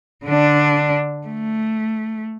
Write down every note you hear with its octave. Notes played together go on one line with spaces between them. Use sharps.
D3 D4
A3